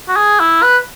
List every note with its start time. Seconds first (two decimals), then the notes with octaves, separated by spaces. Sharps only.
0.09 F#4
0.16 G#4
0.40 E4
0.63 B4